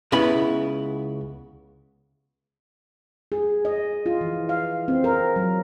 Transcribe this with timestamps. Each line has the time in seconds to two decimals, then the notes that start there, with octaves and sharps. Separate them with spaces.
0.12 C#2 C#3 B3 E4 B5
3.32 G#4
3.65 D#5
4.06 F4
4.21 E3
4.49 F5
4.88 C4
5.04 A#4
5.36 F#3